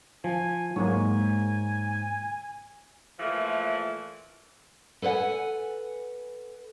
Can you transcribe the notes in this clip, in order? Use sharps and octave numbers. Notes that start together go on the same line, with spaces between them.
F3 G#5
G#2 F#3 G#3 A#3 C#5 G#5
A#2 E3 F3 A3
A4 B4 C5 F#5 G#5